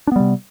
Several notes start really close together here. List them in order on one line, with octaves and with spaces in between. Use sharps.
D4 B3 G3 C3